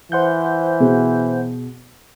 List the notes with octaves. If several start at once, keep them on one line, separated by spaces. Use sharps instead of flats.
E3 C5 F#5 G6
B2 G#4